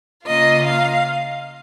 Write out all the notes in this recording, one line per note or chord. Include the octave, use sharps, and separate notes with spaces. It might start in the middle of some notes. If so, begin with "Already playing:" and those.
C#3 A#3 F4 D#5
F5